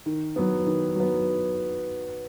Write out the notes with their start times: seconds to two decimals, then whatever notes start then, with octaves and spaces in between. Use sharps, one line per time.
0.06 D#3
0.36 F#3 B3
0.66 D#3
0.95 F#3 B3